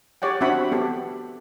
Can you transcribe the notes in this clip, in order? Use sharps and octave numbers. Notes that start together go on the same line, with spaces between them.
G4 C#5 D5 F#5 G5
C4 D4 F#4 E5 F#5 B5
B3 G4 A4